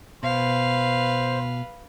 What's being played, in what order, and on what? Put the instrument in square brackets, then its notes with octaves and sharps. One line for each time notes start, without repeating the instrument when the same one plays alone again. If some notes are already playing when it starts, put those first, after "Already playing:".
[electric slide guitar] B2 [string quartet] B4 F5 [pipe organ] C5